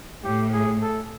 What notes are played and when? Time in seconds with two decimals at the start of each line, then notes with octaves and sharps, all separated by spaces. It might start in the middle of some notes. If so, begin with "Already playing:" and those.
0.24 A2 G4
0.53 G#4
0.82 A4